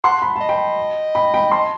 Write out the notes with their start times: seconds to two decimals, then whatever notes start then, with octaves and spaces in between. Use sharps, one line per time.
0.04 F#5 A5 C6
0.22 B5
0.36 A5
0.41 D#5
0.49 G5 B5
1.15 G5 B5
1.34 G5 B5
1.51 A5 C6